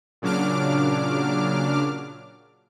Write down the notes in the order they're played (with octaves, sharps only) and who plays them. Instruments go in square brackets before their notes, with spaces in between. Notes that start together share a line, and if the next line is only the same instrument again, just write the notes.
[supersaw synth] A#2 C#3 F#3 D4 D6 F6